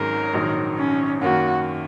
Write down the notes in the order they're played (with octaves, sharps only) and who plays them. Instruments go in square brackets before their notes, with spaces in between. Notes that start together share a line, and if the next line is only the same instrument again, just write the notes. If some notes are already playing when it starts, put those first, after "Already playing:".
Already playing: [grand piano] G#1 G#2 F#3 C#4 G#4 [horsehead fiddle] A#4
[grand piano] A#1 G#2 D#3 F#3 D#4
[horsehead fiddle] C#4
[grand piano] F#2 D#3 A#3 [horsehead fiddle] F#4